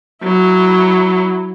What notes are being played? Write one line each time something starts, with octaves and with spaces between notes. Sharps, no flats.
F#3 E4